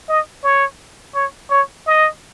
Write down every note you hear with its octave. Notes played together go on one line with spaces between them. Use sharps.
D#5
C#5
C#5
C#5
D#5